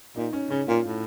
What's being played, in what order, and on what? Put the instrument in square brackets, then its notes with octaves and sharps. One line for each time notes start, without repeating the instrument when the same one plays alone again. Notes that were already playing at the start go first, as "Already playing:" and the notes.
[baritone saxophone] A#2 [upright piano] D#4
[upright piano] C#4
[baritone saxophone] C#3 [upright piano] C#4
[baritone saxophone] A#2 [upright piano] F4
[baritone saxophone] A2